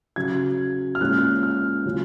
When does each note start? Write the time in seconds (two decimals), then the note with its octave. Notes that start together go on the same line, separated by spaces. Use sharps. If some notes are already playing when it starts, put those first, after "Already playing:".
0.16 C#3 F#3 C#4 G#6
0.95 F6
1.01 A#2 G#3 C#4 F#6
1.43 F6
1.85 C#3 F#3 C#4 F4